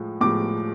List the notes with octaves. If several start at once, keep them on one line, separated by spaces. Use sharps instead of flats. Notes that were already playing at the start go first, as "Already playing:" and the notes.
Already playing: A2 F3 G#3
A2 F3 G#3 D6